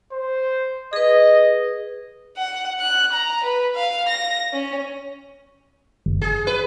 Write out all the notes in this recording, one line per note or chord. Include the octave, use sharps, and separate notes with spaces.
C5
G#4 B4 D#5
F#5
F#6
A#5
B4
F5
A#6
C#4
G1
G#4
B4